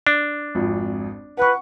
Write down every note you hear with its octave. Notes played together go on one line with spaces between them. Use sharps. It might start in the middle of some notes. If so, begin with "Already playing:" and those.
D4
G#1 F2
B4 F#5 C#6